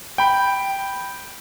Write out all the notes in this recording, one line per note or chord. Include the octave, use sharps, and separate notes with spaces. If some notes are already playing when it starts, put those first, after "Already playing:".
G5 B5